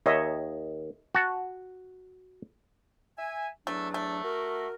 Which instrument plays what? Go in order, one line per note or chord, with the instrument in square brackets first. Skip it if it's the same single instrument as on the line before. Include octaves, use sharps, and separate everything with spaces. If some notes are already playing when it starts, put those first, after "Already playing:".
[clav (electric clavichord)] D#2 [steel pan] C#5 D#5 E5
[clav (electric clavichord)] F#4 A5
[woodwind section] E5 G#5
[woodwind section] E2 F#3 D4 [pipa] A3
[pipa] A3
[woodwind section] F#4 A#4